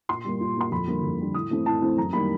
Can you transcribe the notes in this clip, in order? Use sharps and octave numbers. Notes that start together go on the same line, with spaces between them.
A#2 C6
G3 A#3
A#2
G3 A#3 C6
F2 B5
D3 G3 A#3
F2
D3 G3 A#3
A2 D#6
E3 A3 C4
A2 A5
E3 A3 C4
F#2 A#5
D#3 G3 A#3 B5